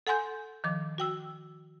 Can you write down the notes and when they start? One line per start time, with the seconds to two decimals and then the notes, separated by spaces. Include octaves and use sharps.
0.07 A4 F#5 G#5 C6 G6
0.64 D#3 F3 D6
0.98 F#4 G5 E6